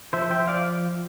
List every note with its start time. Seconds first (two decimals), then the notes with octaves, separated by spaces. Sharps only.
0.13 F3 C5 E5
0.31 E5 G5
0.39 F3
0.47 D5 F5